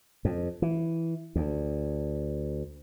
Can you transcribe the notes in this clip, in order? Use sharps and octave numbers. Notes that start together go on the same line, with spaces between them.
F2
E3
D2